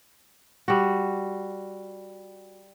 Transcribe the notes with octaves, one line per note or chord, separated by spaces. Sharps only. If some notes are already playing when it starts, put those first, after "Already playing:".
G3 F#4